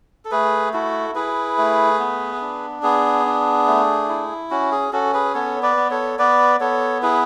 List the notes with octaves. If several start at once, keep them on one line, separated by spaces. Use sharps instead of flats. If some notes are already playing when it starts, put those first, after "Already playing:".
A4
A3 G#4 B4
E4 F#4 A4
E4 G#4 B4
A3
B3
D4
B3 G#4
D4
A3
E4
C#4 F#4
G#4
C#4 F#4 A4
G#4 B4
B3 A4 C#5
B4 D5
B3
A4 C#5
B3 B4 D5
B3 A4 C#5
E4 G#4 B4